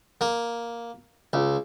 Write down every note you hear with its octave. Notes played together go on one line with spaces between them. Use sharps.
A#3
C#2